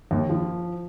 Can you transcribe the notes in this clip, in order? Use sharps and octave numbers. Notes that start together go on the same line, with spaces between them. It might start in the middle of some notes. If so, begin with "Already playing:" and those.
D#2
F3